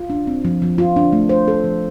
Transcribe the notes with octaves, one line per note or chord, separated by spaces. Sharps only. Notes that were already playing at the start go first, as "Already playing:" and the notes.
Already playing: F4
D4
C4
F3
F3
F4
D4
A3
C5
A4
F3